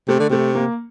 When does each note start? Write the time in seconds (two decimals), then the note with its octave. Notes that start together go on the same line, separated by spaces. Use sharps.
0.08 C3 A3
0.20 D3
0.30 C3 A3
0.55 A#3